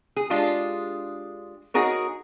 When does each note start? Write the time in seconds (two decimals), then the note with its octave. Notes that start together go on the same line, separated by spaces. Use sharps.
0.16 G#4
0.30 G#3 D4 F4 G4 G#4
1.74 D#4 F#4 G#4 A#4 C#5